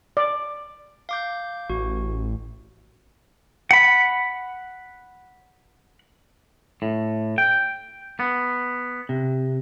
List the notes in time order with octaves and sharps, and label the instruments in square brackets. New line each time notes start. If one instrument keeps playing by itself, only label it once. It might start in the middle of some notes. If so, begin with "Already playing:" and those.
[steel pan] D5
[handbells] F5 D6 G6
[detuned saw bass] A1 [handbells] F#4
[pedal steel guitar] F#5 B5
[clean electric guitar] A2
G5
B3
C3